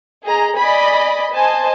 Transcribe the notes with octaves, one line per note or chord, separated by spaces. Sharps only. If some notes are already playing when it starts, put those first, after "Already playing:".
G#4 D#5 A#5
D5 D#5 G#5 B5
C5 D#5 G#5 A5